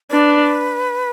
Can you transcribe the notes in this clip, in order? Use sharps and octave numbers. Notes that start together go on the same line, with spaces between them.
D4 B4